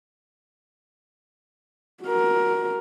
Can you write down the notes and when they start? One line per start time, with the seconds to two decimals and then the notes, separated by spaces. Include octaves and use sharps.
2.04 F#4 A#4